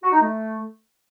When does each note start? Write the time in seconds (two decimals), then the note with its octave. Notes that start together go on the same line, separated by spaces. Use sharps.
0.03 F#4
0.12 D#4
0.21 A3